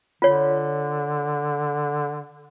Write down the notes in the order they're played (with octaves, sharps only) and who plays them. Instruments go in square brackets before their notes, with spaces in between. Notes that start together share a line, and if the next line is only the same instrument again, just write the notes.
[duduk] D3 [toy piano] F4 C#5